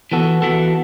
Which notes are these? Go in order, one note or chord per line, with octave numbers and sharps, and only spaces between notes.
E3 B3 F#4 A4
E3 B3 F#4 A4